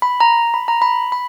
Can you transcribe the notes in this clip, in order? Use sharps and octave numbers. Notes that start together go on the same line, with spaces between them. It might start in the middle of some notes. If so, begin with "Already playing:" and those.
B5
A#5
B5
A#5
B5
B5